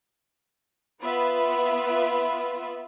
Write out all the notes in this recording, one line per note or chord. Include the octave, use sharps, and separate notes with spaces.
B3 F4 B4 E5